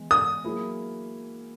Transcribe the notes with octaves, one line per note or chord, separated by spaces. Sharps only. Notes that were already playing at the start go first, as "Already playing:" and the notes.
Already playing: E3 G#3 B3
D#6
F#3 A#3 E4 G#4